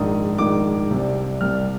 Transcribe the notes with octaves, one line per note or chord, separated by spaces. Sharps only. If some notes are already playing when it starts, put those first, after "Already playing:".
Already playing: A#1 G#2 D#3 D#6
A#1 G#2 D#3 D6
C2 C3 G3
C2 C3 G3 F6